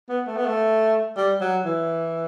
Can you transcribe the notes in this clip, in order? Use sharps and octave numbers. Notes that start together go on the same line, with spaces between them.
B3
A3
B3
A3
G3
F#3
E3